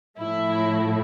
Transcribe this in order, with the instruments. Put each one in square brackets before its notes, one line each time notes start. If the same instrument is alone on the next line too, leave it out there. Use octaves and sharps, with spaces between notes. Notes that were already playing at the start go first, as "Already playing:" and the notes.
[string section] A2 F3 A3 E4